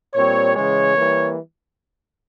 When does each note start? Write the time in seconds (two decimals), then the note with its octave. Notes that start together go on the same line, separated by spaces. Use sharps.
0.14 A#2 G3 C4 C#5
0.55 C#3 E3 G#3 C#5
0.97 E3 G3 A#3